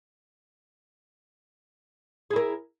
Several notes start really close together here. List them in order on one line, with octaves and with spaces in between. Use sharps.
G#4 E4 A#4